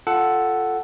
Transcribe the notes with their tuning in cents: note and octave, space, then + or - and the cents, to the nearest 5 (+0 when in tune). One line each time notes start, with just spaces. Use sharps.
F4 +0 A4 +0 F#5 +10